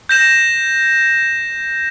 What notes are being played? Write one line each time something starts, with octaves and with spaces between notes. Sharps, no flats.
G6 A#6 E7